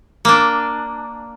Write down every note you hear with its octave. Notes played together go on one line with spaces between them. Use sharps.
A#3 D4